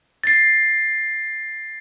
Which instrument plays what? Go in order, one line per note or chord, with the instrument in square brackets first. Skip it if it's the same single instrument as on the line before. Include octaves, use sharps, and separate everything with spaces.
[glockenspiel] A6 C7